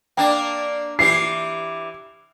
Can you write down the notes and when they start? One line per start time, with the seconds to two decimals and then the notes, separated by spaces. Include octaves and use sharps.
0.17 A#3 D4 G5
0.99 E3 E4 G4 C7